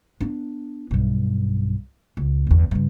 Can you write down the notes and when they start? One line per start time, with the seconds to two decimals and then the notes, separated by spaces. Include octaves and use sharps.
0.21 B3 D4
0.91 B1 G2
2.17 C#2
2.47 G1 E2
2.71 G2 C#3